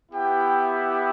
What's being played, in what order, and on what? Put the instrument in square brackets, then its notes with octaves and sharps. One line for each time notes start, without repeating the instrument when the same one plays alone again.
[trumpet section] B3 E4 G4 G5